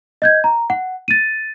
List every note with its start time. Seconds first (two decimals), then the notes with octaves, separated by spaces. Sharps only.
0.22 D#5 G6 G#6
0.44 A#5
0.70 F#5
1.08 A6 D#7